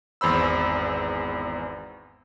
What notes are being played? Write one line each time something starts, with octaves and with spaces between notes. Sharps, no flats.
G#1 E2 C5 B5 E6